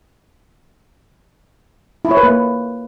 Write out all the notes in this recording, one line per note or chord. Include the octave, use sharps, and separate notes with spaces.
E4
C#5
B4
A#3